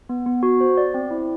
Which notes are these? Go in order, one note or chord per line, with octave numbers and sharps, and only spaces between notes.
B3
B3
F#4
C5
D5
C4
E4